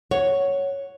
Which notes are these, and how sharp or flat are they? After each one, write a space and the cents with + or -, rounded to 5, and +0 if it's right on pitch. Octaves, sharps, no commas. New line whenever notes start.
C#5 +0 F#5 +0